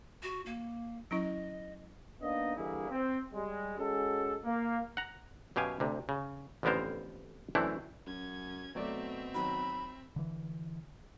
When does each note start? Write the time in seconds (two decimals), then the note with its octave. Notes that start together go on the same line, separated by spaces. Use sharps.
0.22 F#4
0.46 A#3
1.11 F#3 C#4 E4 D#5
2.21 A#3 B3 D4 D#4 D#5
2.56 D3 E3 G3 A#3 E4 G#4
2.89 C4
3.32 G3 G#3
3.77 G#3 C#4 F#4 A4
4.45 A#3
4.97 F#5 A#5
5.56 F#2 B2 G4 F5 G#5
5.80 D2 C3
6.09 C#3
6.63 A1 F2 D3 B3 A#4 C5
7.55 F#2 E3 A3 C4 D4 E4
8.06 F#2 C#4 G#6
8.75 B2 F#3 A3 C4 D5 E5
9.35 D#3 F#3 B5
10.16 D3 E3